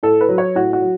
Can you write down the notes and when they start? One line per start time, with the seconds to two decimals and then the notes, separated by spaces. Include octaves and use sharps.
0.03 A2 A4
0.21 B4
0.29 F#3
0.38 C#5
0.55 A2 F#4
0.73 F#4
0.82 F#3